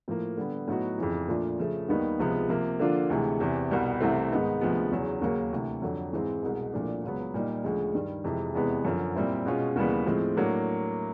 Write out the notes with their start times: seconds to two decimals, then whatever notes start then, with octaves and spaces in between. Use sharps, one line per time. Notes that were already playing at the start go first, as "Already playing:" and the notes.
0.08 A2 F3 A#3
0.37 D3 G3 B3
0.67 A2 F#3 B3 D#4 F#4
0.98 F2 C#3 E3
1.28 A#2 F3 A3 D4 F4
1.59 C#3 F3 A3
1.89 D#2 D#3 G3 B3 D#4
2.19 C#2 C3 F3 G#3 B3
2.49 C3 F3 A#3
2.79 D3 F3 A#3 D4 F4
3.10 D2 C3 E3 G#3
3.40 E2 C3 E3
3.70 C2 B2 G3 B3
4.00 C2 C3 E3 A3 C4
4.31 G#2 D#3 G#3 B3 D#4
4.61 D2 C3 F3 G#3 B3
4.91 E2 C#3 F#3
5.22 D#2 C#3 F#3 A#3
5.53 D2 C3 E3
5.82 F2 D3 F#3
6.13 G#2 E3 G#3 C4
6.43 C2 B2 G#3
6.73 C2 A#2 F3 A3 D4
7.03 C#2 C#3 F#3 B3
7.34 A#2 G3 A#3 D#4
7.64 D2 C#3 F3 G#3
7.94 G2 D#3 G3
8.24 F2 C3 E3 G#3
8.54 E2 C3 E3 G#3 B3
8.85 F#2 D3 F3
9.16 A#2 G3 C4 E4
9.46 B2 G#3 C#4 F4
9.76 D#2 C#3 E3 G3 B3
10.06 A2 F3 G#3 C4
10.36 A2 F#3 A#3 D4